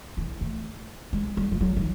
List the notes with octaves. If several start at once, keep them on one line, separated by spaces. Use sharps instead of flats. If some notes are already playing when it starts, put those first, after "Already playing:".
E3
A3
G#3
G3
F3
F#3
D#3